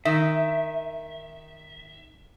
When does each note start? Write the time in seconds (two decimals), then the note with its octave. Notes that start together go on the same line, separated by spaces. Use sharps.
0.05 D#3 E5